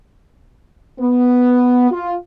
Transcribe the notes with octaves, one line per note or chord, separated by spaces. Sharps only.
B3
F4